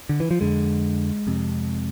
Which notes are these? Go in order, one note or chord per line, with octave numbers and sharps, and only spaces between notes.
D3
E3
F3
F2 D3 G#3
F2 C3